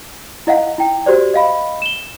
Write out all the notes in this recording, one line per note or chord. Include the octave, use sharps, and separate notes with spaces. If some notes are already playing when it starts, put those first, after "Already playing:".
E4 D#5 F5 F#5
E4 G5
F#4 G4 C5 D5
D#5 F5 B5
E7 G7